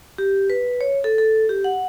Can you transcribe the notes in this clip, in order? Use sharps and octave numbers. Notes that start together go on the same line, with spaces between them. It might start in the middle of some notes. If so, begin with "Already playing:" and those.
G4
B4
C#5
A4
A4
G4
F#5